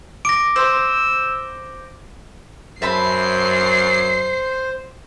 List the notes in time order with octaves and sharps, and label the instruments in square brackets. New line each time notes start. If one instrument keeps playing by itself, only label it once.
[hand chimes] D6 [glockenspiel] A#6 D7
[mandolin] C5 [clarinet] E6
[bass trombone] F#2 [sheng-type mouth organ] C5 [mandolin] E5 A5 B5 [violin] C7